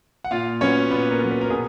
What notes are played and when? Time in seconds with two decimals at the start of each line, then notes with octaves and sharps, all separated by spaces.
0.24 F#5
0.31 A#2 F4 F5
0.61 F#3 B3 C#4 C#5
0.91 A#2 B3 B4
1.11 A#4
1.21 F#3 B3
1.31 B4
1.41 A#4
1.50 B2 G#4